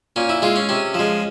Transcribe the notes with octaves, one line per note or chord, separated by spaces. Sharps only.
A#2 C#4
E4
G#3 F4
C#4
C3 C#4
F3 G#3